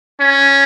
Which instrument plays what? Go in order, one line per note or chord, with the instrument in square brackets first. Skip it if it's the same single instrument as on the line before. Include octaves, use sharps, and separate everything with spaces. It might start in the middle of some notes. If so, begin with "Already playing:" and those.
[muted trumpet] C#4